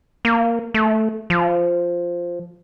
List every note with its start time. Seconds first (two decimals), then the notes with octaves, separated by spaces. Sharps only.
0.25 A#3
0.74 A3
1.30 F3